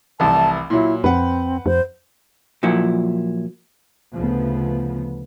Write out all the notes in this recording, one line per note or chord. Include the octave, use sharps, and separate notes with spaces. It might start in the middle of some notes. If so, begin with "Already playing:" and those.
F1 C2 E3 A5
A#2 F#3 E4
F2 C4 B4 F#5
F2 C5
A#2 F3 F#3 E4
D2 C#3 F3 B3